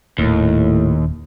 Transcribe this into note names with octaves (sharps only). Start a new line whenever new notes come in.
D#1 D#2 A2